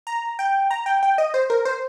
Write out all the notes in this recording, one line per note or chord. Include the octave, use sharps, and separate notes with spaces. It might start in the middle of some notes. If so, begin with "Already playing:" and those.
A#5
G5
A#5
G5
G5
D#5
C5
A#4
C5